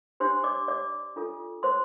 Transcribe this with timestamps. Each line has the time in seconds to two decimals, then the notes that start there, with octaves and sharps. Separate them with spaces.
0.20 D4 G4 C5 C6
0.44 D5 D6
0.68 D5 D6
1.16 D4 F4 A4
1.63 C5 C6